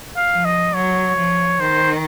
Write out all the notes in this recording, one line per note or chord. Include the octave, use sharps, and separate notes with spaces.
F5
F3
D#5
F#3 C#5
F3
D#3 C5